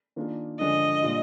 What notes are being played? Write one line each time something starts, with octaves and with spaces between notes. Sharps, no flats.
D#3 A#3 D4 F4 G#4
G2 D3 F3 G#3 D4 D#5
A#2 G3 D4 F4